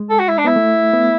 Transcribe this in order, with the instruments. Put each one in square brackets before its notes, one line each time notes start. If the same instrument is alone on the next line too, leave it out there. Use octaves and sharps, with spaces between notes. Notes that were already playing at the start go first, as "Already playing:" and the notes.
Already playing: [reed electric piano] G#3
[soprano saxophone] A4
F#4
E4
D4
[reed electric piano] B3 [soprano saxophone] E4
[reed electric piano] A3
B3